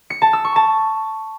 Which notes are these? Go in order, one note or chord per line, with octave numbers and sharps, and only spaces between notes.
C#7
A5
E6
C#6
A5